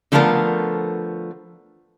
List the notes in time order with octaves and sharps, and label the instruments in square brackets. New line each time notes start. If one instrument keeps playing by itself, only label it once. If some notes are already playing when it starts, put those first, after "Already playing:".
[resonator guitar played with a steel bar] D3 F3 A3 B3 F4 A#4